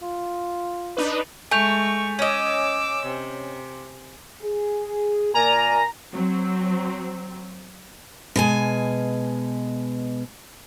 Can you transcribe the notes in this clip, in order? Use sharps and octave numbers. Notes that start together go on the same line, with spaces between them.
F4
D4 D#4 B4
G#3 A3 G#5 C#6 G6 F7
C#4 D#5 D6 E6
C3
G#4
A#2 A#4 D5 G#5 A#5
F#3 C4
B2 G#3 G#5